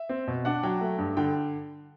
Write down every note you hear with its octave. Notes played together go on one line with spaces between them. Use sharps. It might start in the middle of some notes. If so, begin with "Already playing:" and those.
Already playing: E5
C4
B2
D4 F#5
F#3 G5
A3
G2
D3 G5